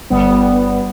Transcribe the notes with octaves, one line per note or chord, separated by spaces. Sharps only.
G1 G3 B3